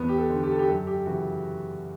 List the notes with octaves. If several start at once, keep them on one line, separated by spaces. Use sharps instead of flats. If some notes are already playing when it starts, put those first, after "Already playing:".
Already playing: E2 B3
G4
A4
D3
G4
A4
G4
F#2 A4
G4
C#3 E3 F#4